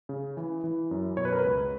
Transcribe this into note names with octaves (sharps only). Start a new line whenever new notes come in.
C#3
E3
E3
F#2
B2 C#5
B4
A#4
B4
C#2